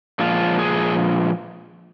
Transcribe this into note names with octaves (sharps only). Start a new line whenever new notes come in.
A#2 F3 G#3 F4
G#4